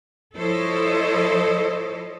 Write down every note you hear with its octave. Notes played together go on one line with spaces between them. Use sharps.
F3 E4 A4 C5 C#5 D#5